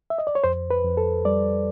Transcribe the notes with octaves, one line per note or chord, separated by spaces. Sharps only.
E5
D#5
D5
C#5
F2 C5
B4
F2
A4
G3 D5